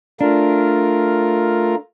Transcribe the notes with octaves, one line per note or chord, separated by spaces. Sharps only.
A3 D4 F4 A#4